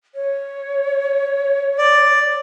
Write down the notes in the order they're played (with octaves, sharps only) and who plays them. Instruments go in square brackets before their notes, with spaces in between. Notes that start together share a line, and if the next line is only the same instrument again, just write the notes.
[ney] C#5
[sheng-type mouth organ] D5